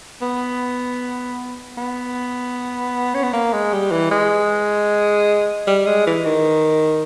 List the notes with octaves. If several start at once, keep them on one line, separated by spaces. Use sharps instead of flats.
B3
B3
C#4
B3
A#3
G#3
G3
E3
G#3
G3
G#3
E3
D#3